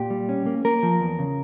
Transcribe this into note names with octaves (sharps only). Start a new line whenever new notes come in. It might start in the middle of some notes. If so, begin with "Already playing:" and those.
Already playing: A#2 G4
G3
C#4
A#3
A#3 A#4
F3
E2
C#3